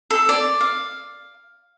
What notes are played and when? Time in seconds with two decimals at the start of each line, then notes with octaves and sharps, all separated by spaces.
0.11 A4
0.29 D5
0.61 F5